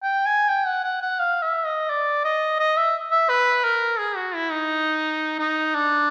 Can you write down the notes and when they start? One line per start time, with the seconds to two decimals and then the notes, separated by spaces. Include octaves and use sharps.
0.03 G5
0.26 G#5
0.49 G5
0.66 F#5
0.84 F#5
1.02 F#5
1.20 F5
1.42 E5
1.66 D#5
1.90 D5
2.25 D#5
2.59 D#5
2.77 E5
3.11 E5
3.30 B4
3.64 A#4
3.99 G#4
4.16 F#4
4.35 E4
4.51 D#4
5.39 D#4
5.75 D4